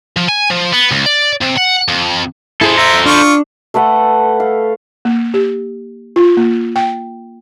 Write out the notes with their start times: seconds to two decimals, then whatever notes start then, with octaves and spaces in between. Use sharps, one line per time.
0.17 F3
0.29 G#5
0.50 F3
0.73 B3
0.91 C#2
1.06 D5
1.42 C3
1.58 F#5
1.88 F2
2.61 E4 G#4 A4 C5
2.78 E5 A#5
3.06 D4 F4 C#6
3.74 A3 A4 B4 F#5
4.40 F5
5.05 A#3
5.34 G4
6.16 F4
6.37 A#3
6.76 G5